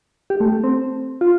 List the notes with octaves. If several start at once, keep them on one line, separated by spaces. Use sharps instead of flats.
G4
A3
A3
C4
F4